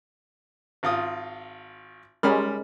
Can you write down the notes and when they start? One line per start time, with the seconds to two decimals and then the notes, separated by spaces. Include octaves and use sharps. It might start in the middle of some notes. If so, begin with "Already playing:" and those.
0.83 G#1 F4 D#6
2.23 G3 G#3 C#4 A#4 B5 F6